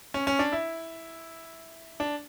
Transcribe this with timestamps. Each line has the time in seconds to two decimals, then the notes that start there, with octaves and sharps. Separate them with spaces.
0.14 C#4
0.27 C#4
0.39 D4
0.52 E4
2.00 D4